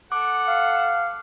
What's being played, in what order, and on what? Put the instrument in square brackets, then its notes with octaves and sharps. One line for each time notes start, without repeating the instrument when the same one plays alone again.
[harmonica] A4 F#5 [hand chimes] D6
[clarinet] F5